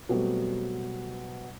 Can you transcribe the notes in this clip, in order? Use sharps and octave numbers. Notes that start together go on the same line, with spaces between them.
B2 F#3 G3 A3 B3 C4